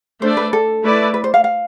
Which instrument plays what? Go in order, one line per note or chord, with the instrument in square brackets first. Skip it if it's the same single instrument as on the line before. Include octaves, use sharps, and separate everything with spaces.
[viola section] A3 D4 A4 D5 [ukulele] C5
[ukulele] B4
A4
[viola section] A3 E4 B4 D5
[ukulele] B4
C5
F5
F5